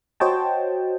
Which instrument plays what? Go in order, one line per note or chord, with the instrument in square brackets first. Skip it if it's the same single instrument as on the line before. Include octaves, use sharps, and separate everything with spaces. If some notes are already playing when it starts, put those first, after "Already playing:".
[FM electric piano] F#4 C5 C#5 D#5 G5 A5